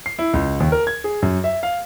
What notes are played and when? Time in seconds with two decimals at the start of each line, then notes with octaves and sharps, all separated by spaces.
0.06 C7
0.19 E4
0.34 C#2
0.60 D#2
0.72 A#4
0.87 G#6
1.04 G#4
1.22 F#2
1.44 E5
1.63 F5